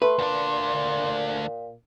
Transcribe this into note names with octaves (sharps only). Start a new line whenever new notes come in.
A3 B4 C6
D2 A#2 D4